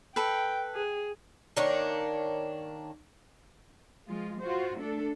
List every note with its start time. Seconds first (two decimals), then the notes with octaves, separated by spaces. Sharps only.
0.16 A4 B4 G5
0.75 G#4
1.57 D#3 A#3 D4 C#5
4.08 F3 G#3 F4
4.40 F4 F#4 C5
4.79 A3 D4 A4